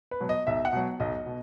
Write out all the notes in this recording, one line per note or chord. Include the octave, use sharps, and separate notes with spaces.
B4
B2 F#3
D#5
B1 E5
F#5
B2 F#3
B1 D#5
B2